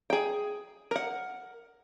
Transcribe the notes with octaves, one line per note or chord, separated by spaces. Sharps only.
G#4 G5
A#4 F#5